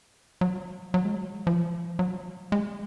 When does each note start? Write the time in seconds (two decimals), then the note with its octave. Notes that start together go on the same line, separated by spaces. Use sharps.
0.41 F#3
0.94 F#3
1.05 G#3
1.15 F#3
1.47 F3
1.99 F#3
2.52 G#3